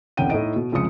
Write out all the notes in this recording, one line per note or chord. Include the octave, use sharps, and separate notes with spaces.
E1 C2 C#4 F#5 G5 D#7
A2 D#4 D#5 D7
B2
F1 C#2 F3 G#3 D#6 C#7